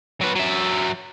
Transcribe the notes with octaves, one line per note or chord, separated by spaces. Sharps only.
F#3 B4
F#3 E5